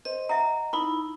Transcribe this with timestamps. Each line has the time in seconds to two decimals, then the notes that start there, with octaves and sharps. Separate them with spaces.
0.05 C5 D#5
0.29 E5 F#5 A#5
0.73 D#4 E4 B5